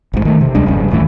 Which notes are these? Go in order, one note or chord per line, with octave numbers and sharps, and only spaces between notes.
A1 G#2
D#3 A3
C3
D2 G3 G#3 D4
F1 A#1 G2 C#3
D1 D#2 A2 E3